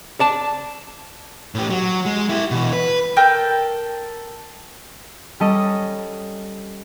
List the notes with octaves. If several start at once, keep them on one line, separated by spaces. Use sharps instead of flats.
D5 A5
A2 G4
F#3
G#3
E4 G4
B2 E3
B4
A4 A#4 G5 G6
G3 C#4 A4 D#5